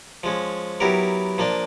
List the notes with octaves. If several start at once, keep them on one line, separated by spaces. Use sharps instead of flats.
F3 G#3 C#4
F#3 B3 E4 G4 A#4
F3 A#3 D4